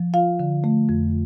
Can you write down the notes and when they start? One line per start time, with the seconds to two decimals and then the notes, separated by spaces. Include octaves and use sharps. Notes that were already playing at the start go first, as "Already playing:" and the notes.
Already playing: F3
0.14 F4 F5
0.40 D3
0.64 A3
0.89 F2